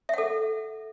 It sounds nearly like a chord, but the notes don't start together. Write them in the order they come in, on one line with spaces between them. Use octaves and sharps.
E5 F#5 A4